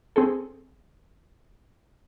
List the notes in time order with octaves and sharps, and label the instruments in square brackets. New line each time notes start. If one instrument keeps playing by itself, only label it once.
[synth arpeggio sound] C4 G#4 A4